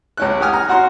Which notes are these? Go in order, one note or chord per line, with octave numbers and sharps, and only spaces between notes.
C#2 C#4 F#6
G4 F#5 G#5 D#6 F6
A#5
F#4 F#5 C6